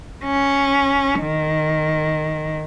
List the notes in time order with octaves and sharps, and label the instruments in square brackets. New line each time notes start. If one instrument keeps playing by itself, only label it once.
[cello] C#4
D#3